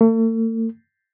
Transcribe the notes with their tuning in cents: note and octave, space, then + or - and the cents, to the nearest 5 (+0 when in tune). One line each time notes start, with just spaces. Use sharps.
A3 +45